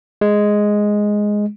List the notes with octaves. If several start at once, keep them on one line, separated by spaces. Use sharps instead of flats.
G#3